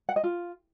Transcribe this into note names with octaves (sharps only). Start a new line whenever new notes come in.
F#5
D#5
F4